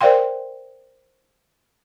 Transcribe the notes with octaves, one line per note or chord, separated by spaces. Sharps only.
A#4 C5 D5 F5 G5 C6